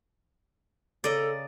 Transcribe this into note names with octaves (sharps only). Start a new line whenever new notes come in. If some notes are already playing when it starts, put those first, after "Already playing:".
C#3 A4 A#4 D5 D#5 D6